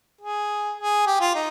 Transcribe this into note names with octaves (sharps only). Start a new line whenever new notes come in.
G#4
G#4
G4
F4
D#4